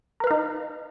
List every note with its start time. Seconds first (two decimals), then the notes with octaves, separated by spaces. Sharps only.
0.20 A#4
0.24 B4
0.27 F5
0.31 D#4